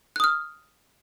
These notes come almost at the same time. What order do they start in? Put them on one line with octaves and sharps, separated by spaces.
F#6 D#6 F6